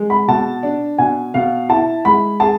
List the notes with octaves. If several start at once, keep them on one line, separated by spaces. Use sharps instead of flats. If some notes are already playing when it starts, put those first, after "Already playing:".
Already playing: G#3
B5
B2 A5
D4
B2 G#5
B2 F5
E4 A5
G#3 B5
G#4 A5